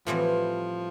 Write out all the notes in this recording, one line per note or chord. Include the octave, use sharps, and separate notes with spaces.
A2 E3 F3 G3 C4